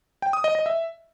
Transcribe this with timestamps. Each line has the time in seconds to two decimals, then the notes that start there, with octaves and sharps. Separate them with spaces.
0.22 G5
0.33 D#6
0.44 D#5
0.55 D#5
0.66 E5